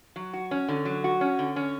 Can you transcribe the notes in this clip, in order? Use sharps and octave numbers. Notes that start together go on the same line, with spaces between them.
F#3
F#4
C#4
D3
F#3
F#4
C#4
D3
C#4